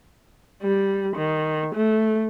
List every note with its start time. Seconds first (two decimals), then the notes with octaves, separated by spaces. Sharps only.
0.63 G3
1.16 D#3
1.75 A3